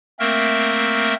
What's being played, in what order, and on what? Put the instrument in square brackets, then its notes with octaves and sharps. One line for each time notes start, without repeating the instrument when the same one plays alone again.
[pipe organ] A3 A#3 C4 A#4 E5